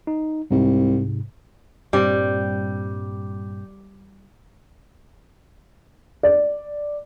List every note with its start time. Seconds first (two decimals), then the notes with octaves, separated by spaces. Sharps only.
0.07 D#4
0.51 C2 G#2 C3
1.93 G2 A#2 G3 C4
6.23 D5